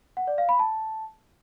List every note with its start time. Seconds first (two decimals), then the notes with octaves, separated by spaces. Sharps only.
0.17 F#5
0.27 D5
0.38 F5
0.49 B5
0.59 A5